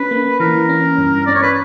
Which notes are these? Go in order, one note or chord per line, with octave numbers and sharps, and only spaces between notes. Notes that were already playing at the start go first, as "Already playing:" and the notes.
Already playing: C#4 B4
A#3
E3 A#4
C#4
G2
C#4 D5
C#5
B4